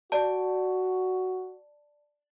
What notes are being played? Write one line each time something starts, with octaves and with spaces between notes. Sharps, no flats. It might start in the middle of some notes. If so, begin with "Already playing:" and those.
F#4 D5 A5